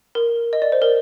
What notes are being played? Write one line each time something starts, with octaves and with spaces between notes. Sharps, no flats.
A#4
D#5
D5
C5
A#4